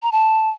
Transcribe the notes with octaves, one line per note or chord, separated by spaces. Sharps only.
A#5
A5